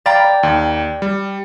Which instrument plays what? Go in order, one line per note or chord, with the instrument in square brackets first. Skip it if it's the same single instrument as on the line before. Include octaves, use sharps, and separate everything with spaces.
[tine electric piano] D5 F5 B5 [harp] G5 A#5 A6
[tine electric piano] D5
[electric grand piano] D#2
G3